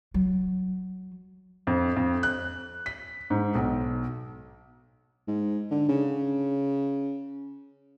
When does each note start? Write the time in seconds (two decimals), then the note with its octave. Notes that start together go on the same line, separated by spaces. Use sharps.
0.14 F#3
1.67 F2
1.96 F2
2.23 F#6
2.86 B6
3.30 G#2
3.55 B1
5.27 G#2
5.71 D3
5.89 C#3